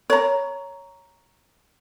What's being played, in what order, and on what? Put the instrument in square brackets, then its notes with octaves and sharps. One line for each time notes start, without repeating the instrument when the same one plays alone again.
[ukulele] C#5 A#5